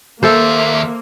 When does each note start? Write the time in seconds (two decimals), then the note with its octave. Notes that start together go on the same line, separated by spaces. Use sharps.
0.23 D#2 A#3 A4 C5 E5